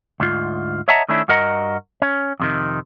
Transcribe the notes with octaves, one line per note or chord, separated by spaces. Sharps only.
D2 G#2 F4
C#5 D#5 E5 F#5 A5 A#5
D#3 A3 C#4 D4 E4
G2 F#4 A#4 D#5 F#5 A#5
C#4
F2 C3 D#3